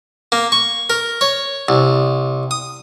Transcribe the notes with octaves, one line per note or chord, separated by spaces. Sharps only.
A#3
C#6
A#4
C#5
C2
D#6